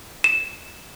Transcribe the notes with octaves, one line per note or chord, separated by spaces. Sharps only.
E7